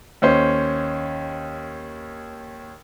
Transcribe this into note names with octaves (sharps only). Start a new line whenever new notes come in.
D#2 C#4 C5